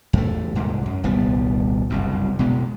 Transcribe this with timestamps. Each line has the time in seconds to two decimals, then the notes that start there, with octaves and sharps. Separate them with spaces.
0.13 E2 A3
0.55 C2 G#2
0.86 F#2
1.03 D#1 C2 G3 B3
1.90 F#1 C2 G2
2.39 B2 G#3 B3